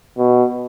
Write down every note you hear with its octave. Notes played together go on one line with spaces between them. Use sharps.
B2